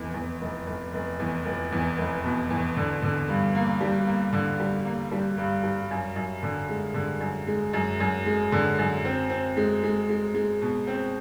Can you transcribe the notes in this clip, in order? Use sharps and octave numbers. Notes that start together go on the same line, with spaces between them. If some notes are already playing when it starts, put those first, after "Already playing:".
Already playing: F1 E2
E2
F1
F1
F1
E2
F1
E2
F1
B2
E2
D3
D3
G2
A#3
G3
A#3
D3
G3
A#3
G3
G2
G3
F#2
F#2
D3
G#3
D3
F#2
G#3
F#2
F#2
G#3
D3
F#2
C4
C4
G#3
G#3
G#3
G#3
B2
C4